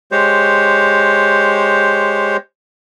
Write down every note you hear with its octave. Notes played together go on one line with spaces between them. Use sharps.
G#3 G4 C5 C#5